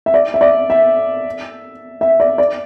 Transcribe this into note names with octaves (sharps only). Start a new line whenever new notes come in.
E5
D5
E5
D5
E5
E5
D5
D5